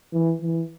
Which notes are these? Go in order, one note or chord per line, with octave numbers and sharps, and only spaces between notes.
E3
E3